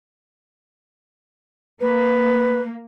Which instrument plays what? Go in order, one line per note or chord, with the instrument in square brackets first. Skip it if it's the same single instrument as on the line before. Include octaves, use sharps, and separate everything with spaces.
[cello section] A#3 [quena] B4